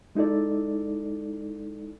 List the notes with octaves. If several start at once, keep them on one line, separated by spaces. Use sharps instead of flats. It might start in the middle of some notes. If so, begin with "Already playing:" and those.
G#3 D#4 E4 A4 D5